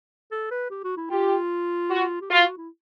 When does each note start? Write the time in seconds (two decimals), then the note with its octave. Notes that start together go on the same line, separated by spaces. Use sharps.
0.31 A4
0.51 B4
0.70 G4
0.84 F#4
0.97 E4
1.10 F4 G4
1.90 F#4
2.21 G4
2.30 F4 F#4
2.43 F#4
2.57 E4